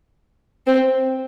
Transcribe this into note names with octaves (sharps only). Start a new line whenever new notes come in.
C4